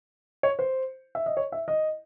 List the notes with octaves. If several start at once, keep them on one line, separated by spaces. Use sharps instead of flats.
C#5
C5
E5
D#5
C#5
E5
D#5